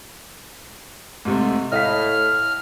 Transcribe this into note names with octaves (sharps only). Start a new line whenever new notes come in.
G#2 C3 A3
A2 D#5 F5 F6 B6